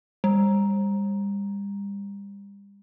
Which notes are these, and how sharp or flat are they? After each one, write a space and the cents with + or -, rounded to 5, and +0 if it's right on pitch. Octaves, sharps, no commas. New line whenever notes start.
G3 +35